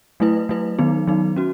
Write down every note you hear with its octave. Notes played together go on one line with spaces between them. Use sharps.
F#3 A3 E4 B4
F#3 A3 E4 B4
D#3 F#3 B3 D#4
D#3 F#3 B3 D#4
C#4 F#4